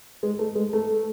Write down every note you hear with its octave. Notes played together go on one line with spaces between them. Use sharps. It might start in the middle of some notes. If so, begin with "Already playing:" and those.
G#3
A3
G#3
A3